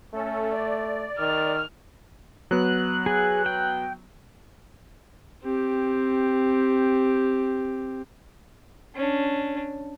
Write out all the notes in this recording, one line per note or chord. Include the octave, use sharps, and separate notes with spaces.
A3 C#4 A4
D5
D#3 F6
F#3 B3 F#6
G#4
G5
C4 G4
C#4 D4